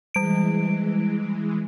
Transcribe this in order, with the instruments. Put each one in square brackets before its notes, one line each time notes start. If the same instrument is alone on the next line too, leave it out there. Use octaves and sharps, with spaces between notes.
[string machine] E3 G#3 [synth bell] G3 D7